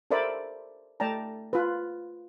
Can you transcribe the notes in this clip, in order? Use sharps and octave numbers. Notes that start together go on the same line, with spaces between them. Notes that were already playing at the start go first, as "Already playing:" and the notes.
A4 A#4 C5 D5 E5 B5
A3 D5 G5 A5 A#5
F4 B4